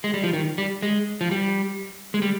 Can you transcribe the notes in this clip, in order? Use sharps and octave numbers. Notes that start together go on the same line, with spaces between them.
G#3
G3
F3
D#3
G3
G#3
F3
G3
G#3
G3